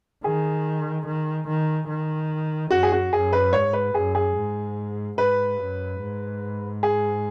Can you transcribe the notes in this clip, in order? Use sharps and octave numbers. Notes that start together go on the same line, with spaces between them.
D#3 G#4
D#3
D#3
D#3
F#2 F#4
G#4
F#4
F#2 G#4
B4
G#2 C#5
B4
F#2 G#4
G#4
G#2
G#2 B4
F#2
G#2
G#4